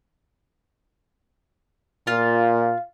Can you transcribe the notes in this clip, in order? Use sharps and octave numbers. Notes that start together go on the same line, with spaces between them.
A#2 F4